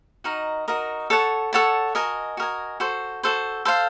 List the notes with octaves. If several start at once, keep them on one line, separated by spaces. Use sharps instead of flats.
D#4 F#4 A#4 D#5
D#4 F#4 A#4 D#5
A4 C#5 F#5 A5
A4 C#5 F#5 A5
F#4 A#4 D#5 G#5
F#4 A#4 D#5 G#5
F#4 A4 C5
F#4 A4 C5
A4 C5 F5